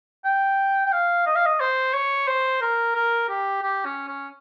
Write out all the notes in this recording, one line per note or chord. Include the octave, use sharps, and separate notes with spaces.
G5
G5
F5
D#5
F5
D#5
C5
C#5
C5
A#4
A#4
G4
G4
C#4
C#4